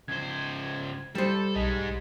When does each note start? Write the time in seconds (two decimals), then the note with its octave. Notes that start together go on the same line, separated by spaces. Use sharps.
0.08 C#2 C5 G#6
1.15 G3 A4 C5
1.55 B1 G#3 D#4 D#5 B6